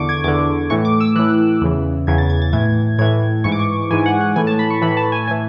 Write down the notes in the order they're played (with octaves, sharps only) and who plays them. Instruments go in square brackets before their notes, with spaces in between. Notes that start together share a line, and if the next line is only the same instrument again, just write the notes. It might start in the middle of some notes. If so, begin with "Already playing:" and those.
Already playing: [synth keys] E2 D3 C#6 D6
G#6
E2 D3 D6
A2 E3 C#6
D6
E6
A2 E3 F#6
E2 C#3 E3
E2 C#3 E3 G#6
A6
G#6
A6
A2 E3 G#6
A2 E3 G#6
G#2 E3 C#6
D6
C#6
G#2 E3 G#5
F#5
F#5
A2 E3 G#5
A5
B5
C#6
A2 E3 B5
A5
G#5
A2 G#5
E3